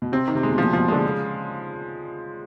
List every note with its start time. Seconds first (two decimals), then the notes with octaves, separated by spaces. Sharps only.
0.02 B2
0.12 C3 C4
0.28 D#3
0.35 C3
0.43 G#3
0.50 B2
0.58 F3
0.63 A#2
0.73 B2 F3
0.88 D3 G#3
1.07 C#3